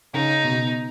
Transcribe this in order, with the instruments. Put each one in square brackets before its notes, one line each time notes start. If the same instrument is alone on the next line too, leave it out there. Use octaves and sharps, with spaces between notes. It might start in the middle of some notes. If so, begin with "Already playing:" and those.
[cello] C#3 [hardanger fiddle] D#4
[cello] B2